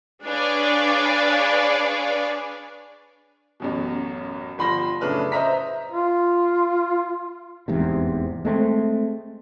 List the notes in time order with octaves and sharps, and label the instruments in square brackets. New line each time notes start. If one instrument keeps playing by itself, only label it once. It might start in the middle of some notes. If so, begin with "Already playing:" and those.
[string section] D4 G#4 B4 C#5 D5 F5
[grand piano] A1 F#2 B2
G1 F3 B5 C6 A#6
F#2 A2 C#3 D4 B4 F6
C5 D#5 E5 A#5 B6
[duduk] F4
[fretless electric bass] F1 E2 G#2 C3
G#3 A3 C4